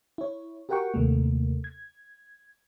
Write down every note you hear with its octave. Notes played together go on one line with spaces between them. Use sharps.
E4 C#5
F#4 G4 A#4 F#5 G5 C#6
D#2 C3 A3 A#3
G#6